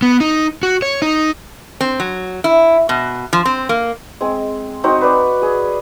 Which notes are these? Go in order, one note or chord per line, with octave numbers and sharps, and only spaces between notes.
B3
D#4
F#4
C#5
D#4
C4
F#3
E4
B2
F3
C4
A#3
G#3 C4
C4 D#4 F#4 C5
B4 D5
G#4